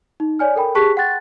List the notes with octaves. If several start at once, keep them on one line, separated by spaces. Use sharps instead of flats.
D#4
C#5 D5 G#5 F6
A4 A#4 G5 B5
G4 G#4 A5 C#6 F#6 B6
F#5 G5 C6 F#6 A6